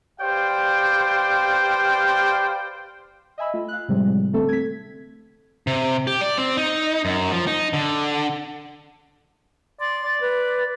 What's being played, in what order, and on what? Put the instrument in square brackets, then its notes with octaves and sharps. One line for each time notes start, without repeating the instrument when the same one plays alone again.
[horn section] G4 B4 C5 D5 F5 G5
[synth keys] D#5 E5 G#5 B5 E6
A3 F4
F5 F#6
A2 C3 F3 G3 G#3
D3 A3 C4 A4
G#6 B6
[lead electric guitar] C3
G4
D5
C4
D#4
F#2
F3
D#4
D3
[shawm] D5 [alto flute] C6
[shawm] D5
[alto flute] B4